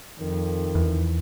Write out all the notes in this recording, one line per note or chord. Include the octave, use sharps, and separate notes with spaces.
F2 D#3
E2